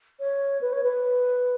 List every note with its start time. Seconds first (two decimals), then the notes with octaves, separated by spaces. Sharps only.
0.19 C#5
0.61 B4
0.73 C#5
0.83 B4